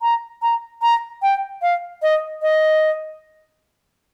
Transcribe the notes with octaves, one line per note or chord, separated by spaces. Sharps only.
A#5
A#5
A#5
G5
F5
D#5
D#5